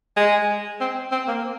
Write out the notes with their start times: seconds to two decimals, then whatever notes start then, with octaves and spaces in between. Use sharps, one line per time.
0.17 G#3
0.80 C4
1.12 C4
1.28 A#3